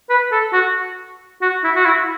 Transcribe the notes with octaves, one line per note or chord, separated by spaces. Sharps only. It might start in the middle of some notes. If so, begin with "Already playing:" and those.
B4
A4
F#4
F#4
E4
F#4
E4